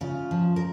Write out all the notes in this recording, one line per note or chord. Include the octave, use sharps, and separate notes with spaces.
C#3 F4
F3
A#4